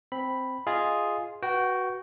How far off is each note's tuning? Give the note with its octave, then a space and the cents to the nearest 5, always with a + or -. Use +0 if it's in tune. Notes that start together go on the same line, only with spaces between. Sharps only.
C4 -5 B5 +0
F4 +0 G#4 +0 D#5 +0
F#4 +5 B4 -15 G5 -20